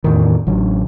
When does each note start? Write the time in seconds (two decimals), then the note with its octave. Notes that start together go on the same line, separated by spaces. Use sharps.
0.04 E2 A2 D#3
0.47 A1 D3 F#3